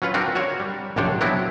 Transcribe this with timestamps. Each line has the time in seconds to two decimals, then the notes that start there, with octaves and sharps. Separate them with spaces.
0.02 F#3 C#4 F4 B4
0.14 C4 D4 F4 F#4 A#4
0.35 F#4 A#4 C#5
0.60 G3
0.96 A#1 F#2 C3 D4 C5 C#5
1.21 F#3 B3 C4 D4 E4